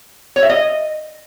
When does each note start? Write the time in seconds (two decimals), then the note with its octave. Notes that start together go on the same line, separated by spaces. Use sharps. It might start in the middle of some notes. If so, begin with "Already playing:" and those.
0.36 C#5
0.43 E5
0.49 D#5